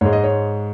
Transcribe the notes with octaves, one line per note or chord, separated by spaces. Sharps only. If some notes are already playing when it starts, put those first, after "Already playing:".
G#2 G#3 C#5
D#5
C#5